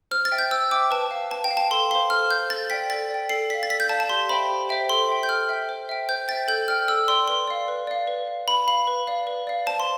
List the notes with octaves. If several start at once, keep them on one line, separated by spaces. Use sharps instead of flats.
C5 F6
A6
E5 G5
G6
C5 E6
E5 G5 D6
B4 A5
F5
B4 A5
G5
F5
A5
A4 C6
C5 F5 C6
A4 F6
C5 F5 G6
A4 A6
D5 G5 B6
A4 A6
D5 G5
A4 C7
D5 F5 B6
A6
A4 B6
G6
D5 F5 A5
A5
G4 C6
C5 E5 G5 B5
G4
C5 E5 G5
A4 C6
E5 G5
G6
A4 F6
E5 G5
C5
E5 G5
C5 G6
E5 G5 A6
A4 G6
D5 G5 F6
A4 E6
D5 G5 C6
B4 C6
D5 F5
B4
D5 F5
B4
F5
B4 B5
F5 B5
B4
D5 F5
B4
D5 F5
C5 A5
C6